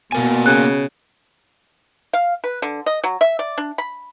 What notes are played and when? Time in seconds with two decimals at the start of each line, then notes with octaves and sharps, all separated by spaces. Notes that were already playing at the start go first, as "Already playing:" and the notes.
0.12 B2 A#3 A#4 G#5
0.46 C#3 F#6
2.13 F5
2.44 B4
2.62 D3
2.86 D#5
3.04 F#3
3.21 E5
3.39 D5
3.58 D4
3.78 B5